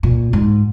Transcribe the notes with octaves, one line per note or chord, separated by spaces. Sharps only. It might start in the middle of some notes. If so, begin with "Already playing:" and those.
A#2
G#2